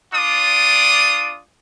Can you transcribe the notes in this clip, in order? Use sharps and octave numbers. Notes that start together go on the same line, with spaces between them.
D4 F4 D5 D#6